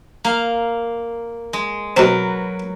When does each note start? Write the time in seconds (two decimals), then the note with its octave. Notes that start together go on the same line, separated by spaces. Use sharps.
0.25 A#3 F5
1.53 G#3
1.97 B2 F#3 C4 A#4 B4